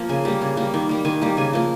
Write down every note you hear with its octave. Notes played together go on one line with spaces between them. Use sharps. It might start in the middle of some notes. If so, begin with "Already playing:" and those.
Already playing: F3 A#3 A#5
C#3 G#5
G3 A#3
C#3
G3 A#3
D#3
G3 A#3
D#3 G#5
G3 A#3
C#3 G#5
F3 A#3